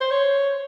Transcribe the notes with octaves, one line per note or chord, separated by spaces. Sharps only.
C5
C#5